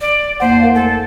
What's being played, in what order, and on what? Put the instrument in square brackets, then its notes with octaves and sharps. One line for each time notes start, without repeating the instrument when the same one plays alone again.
[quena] D5
[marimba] F2 A#3 F#5 [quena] C5
[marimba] A#4 F5
[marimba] A3 [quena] A4